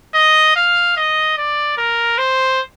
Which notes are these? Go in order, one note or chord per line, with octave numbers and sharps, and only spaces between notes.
D#5
F5
D#5
D5
A#4
C5